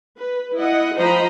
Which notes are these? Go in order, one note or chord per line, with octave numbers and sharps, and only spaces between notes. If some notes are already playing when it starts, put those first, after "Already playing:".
B4
E4 D#5 F#5
F3 C5 D#5 G5 A#5 B5